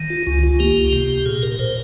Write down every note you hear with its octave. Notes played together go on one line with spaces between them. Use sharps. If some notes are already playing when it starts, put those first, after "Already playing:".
Already playing: D#3
F4
C#2 F4
F4
A#3 G4
C3
A#2 G#4
A#4
A#2 C5